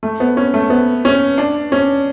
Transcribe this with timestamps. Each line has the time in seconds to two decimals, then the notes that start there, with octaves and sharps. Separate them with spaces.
0.03 A3
0.20 B3
0.37 C#4
0.54 A3
0.70 B3
1.05 C#4
1.38 D4
1.72 C#4